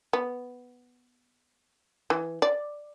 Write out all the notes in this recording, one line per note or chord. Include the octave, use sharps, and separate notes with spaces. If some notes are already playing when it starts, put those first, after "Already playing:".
B3
E3
D5